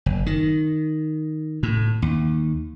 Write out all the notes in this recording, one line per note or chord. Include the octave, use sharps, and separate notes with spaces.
F#1
D#3
A2
D#2